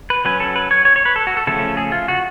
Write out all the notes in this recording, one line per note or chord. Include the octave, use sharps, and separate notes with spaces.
B4
F#3 C#4 B4
A4
B4
C#5
C#5
C#5
B4
A4
F#4
A4
C#3 F3 A3 C#4 A4
G#4
F4
F#4